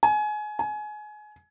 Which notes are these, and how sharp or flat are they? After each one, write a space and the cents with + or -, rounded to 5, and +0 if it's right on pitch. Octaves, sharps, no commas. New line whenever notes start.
G#5 +25
G#5 +25